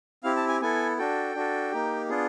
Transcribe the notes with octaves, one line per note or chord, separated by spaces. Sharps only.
C4 E4 G4 F5
A5
G#5
B3 E4 A4 G#5
D4 F#4 A4 G5
D4 F#4 A4
A#3 D#4 G4
B3 D4 F4 G#4